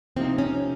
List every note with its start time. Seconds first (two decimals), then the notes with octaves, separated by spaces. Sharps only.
0.16 C3 F3 A#3 C4 D#4
0.38 C#4